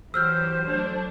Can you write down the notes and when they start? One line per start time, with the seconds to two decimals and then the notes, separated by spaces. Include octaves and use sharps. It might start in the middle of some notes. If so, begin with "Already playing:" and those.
0.14 E3 F#3 G4 C5 E6 F6 G6
0.65 F#3 A3 D4